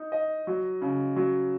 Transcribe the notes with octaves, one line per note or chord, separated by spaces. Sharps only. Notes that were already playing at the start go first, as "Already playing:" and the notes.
Already playing: D#4
D#5
F#3
C#3
F#3